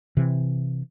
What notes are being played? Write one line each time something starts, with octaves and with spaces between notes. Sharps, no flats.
C3 E3